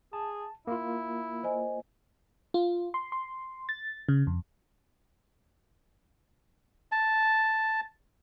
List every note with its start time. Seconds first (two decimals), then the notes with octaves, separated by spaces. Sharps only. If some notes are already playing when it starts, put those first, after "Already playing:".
0.13 G#4 A5
0.67 A#3 E4 F4
1.43 C5 D#5 G#5
2.54 F4
2.94 C6
3.12 C6
3.69 A6
4.09 C#3
4.27 F2
6.92 A5